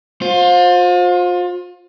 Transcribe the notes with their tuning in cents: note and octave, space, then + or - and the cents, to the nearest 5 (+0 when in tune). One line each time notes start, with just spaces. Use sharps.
F4 +35 C5 +15